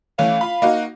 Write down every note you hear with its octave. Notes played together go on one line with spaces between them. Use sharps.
E3 A3 C#4 F5
F4 B5
A#3 D#4 F#4